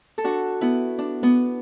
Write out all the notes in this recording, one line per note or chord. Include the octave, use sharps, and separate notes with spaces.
A4
D4 F#4
B3 E4
D4
B3